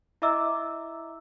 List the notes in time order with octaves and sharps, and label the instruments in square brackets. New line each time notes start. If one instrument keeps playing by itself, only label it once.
[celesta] E4 D#5 E5 A#5 D6 E6